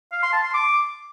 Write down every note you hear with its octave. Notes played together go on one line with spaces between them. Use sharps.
F5
C6
A5
C6
D6